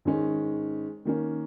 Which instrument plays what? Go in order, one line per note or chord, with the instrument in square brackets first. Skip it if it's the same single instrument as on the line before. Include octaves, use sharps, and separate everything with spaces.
[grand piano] G#2 D#3 G#3 C#4
D#3 A#3 C#4